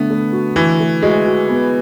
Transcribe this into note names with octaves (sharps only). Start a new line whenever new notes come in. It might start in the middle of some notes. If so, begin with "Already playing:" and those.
Already playing: D3 A3 B3
A3
F#4
E3 F#4
A3
G#3 F#4
F#4
B3